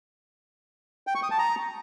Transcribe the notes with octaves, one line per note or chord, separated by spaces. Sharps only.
G5
C#6
D#6
A5
A#5